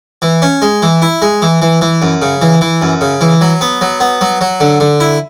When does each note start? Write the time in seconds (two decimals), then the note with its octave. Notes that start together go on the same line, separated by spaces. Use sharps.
0.22 E3
0.42 C#4
0.62 G#3
0.82 E3
1.02 E4
1.22 G#3
1.42 E3
1.62 E3
1.81 E3
2.02 F#2
2.22 C#3
2.42 E3
2.61 E3
2.82 F#2
3.01 C#3
3.21 E3
3.41 F#3
3.61 B3
3.81 F#3
4.00 B3
4.21 F#3
4.41 F#3
4.60 D3
4.80 D3
5.00 E4